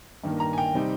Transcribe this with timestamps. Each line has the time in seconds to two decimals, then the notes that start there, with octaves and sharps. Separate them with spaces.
0.24 G2 D#3 A#3
0.40 A#5
0.53 G#5
0.58 G5
0.74 C3 G3 C4 D#4